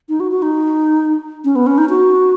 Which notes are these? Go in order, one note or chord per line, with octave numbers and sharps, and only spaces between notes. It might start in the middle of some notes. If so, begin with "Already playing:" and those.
D#4
F#4
F#4
D#4
C#4
B3
C#4
D#4
F#4